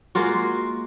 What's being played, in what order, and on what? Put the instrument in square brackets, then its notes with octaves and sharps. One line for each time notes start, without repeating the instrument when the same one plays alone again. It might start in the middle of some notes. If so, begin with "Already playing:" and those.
[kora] G#3 A#3 F4 F#4